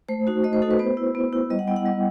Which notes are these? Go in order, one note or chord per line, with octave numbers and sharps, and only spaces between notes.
A3 C5
D#4 F#4
A3 D#5
C5
D#4 F#4 A4
B4
B3 C5
E4
B3
E4
G3 D#5
F#5
B3 E4 G5
F#5
G3 D#5